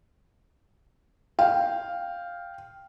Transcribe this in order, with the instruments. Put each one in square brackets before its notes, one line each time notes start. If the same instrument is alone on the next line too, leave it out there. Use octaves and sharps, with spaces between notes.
[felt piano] F5 G5